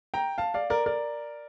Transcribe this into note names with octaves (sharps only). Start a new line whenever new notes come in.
G5 A#5
F5 A5
D5 F5
A#4 D5
A#4 D5